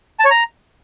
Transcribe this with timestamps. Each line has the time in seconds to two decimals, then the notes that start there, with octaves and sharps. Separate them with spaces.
0.19 A5
0.25 C#5
0.30 A#5